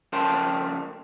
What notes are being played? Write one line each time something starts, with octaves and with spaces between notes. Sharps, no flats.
C#3 F3 A#4 G5 A5 C6